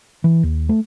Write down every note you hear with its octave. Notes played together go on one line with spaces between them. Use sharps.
E3
D#2
A3